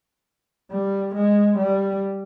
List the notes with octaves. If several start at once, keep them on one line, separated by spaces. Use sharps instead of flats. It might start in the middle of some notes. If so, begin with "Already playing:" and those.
G3
G#3
G3